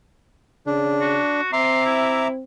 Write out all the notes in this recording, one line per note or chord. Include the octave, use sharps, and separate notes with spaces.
C#3 D4
F#4
C4 E5 A#5 C6 D6
E4